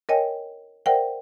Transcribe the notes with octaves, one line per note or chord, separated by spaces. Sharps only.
A#4 C#5 D#5 G5 G#5
A#4 C5 D5 E5 F#5 G5